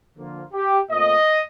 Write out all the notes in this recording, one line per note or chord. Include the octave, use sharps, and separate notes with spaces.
D3 F3 A#3 F4
G4
A#2 A3 C4 F4 D#5